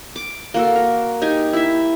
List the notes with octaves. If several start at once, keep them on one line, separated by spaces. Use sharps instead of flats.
D6
A#3 F#4 A4
A#4
D#4 G4 G#5
E4 E5